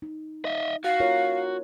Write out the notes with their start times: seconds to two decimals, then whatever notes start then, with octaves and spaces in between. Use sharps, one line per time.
0.02 D#4
0.45 D#5 E5
0.84 F#4 F5
1.00 F4 A#4 C#5